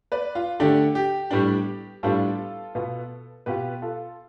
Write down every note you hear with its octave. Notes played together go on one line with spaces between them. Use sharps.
B4 D5
F4
D3 A3 D4 G4
G4
A2 G3 B3 D4
A2 G3 B3 D4 F4 A4
B2 B3 F4
B2 B3 F4 G4 B4
F4 A4